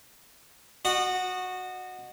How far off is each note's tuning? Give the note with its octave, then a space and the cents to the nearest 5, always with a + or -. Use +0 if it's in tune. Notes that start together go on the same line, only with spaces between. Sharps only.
F#4 -10 D#5 -30